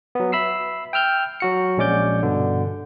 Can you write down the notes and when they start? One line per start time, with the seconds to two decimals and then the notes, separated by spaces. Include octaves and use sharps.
0.15 F#3 B3
0.32 E5 B5 E6 C7
0.93 G5 E6 F6 G6
1.40 F#3 F#4 C#7
1.77 A#1 G#3 C#4 D5 D6 G6
2.23 G2 B2 D3